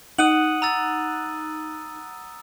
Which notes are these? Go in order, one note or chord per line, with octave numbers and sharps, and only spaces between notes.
D#4 F#5 D#6 D#7 F#7
A#5 E6 A6